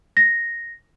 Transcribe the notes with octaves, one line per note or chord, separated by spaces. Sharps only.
A#6